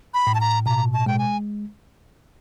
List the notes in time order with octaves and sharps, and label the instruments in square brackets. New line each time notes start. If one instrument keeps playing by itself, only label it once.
[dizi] B5
[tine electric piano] A2
[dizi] A5
A#5
[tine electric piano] B2 [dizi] A#5
[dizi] A5
[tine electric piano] G#3 [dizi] G5
[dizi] G#5